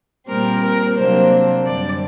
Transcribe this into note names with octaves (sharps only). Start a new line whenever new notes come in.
A#2 G3 C4 A#4
A#4
C3 F#3 A#3 D4 C5
F#2 D3 G3 D4 D5